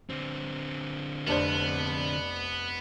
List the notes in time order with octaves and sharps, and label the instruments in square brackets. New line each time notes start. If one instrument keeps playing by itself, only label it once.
[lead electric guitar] D3 C4
[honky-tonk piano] F1 D4 C5 [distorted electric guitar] B3